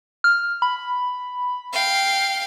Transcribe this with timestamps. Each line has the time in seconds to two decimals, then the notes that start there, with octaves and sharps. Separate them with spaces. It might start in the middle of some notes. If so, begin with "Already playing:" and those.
0.24 F6
0.62 B5
1.73 F5 G5